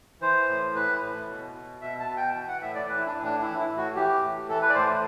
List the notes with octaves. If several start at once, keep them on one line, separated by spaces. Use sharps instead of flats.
E3 C5
A2
E3 B4
A2
B2
B2
B2 E5
A5
B2
G5
E3
F#5
A2 E5
D5
E3 B4
E4
D4
A2
D4
E3 E4
E4
A2
F#4
E3 G4
A2
E3 A4
B4
D5
A2 C5